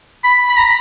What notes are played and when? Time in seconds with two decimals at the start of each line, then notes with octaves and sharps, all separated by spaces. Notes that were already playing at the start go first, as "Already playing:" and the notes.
0.24 B5
0.49 B5
0.57 A#5